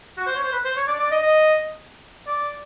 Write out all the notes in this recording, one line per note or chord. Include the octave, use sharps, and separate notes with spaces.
F#4
C5
C#5
C5
B4
C5
C#5
D5
D5
D#5
D#5
D5